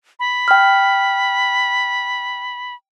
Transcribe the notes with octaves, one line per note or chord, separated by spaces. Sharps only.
B5
G5 F6